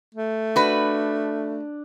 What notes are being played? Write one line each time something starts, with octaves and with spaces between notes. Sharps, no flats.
A3
D4 F#4 B4